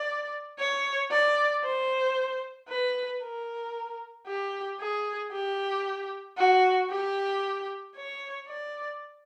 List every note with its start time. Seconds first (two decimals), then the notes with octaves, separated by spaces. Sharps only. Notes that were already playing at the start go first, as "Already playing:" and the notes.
Already playing: D5
0.59 C#5
1.11 D5
1.64 C5
2.69 B4
3.23 A#4
4.27 G4
4.80 G#4
5.33 G4
6.37 F#4
6.90 G4
7.96 C#5
8.48 D5